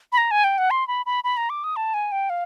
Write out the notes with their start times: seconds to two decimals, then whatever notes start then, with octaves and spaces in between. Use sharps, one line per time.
0.12 B5
0.18 A#5
0.31 G#5
0.44 G5
0.58 F#5
0.71 C6
0.88 B5
1.06 B5
1.24 B5
1.37 A#5
1.50 D6
1.64 D#6
1.76 A5
1.94 G#5
2.12 G5
2.30 F5